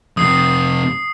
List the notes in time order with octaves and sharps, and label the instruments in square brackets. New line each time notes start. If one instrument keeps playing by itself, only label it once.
[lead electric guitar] F2 C3 [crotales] D#6 C7